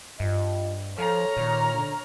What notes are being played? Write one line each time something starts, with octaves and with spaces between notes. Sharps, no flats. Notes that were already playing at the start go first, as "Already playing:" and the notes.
G2 F4 D#5
F3 A4 C#5 A#5 F6
A#2 D#3
D3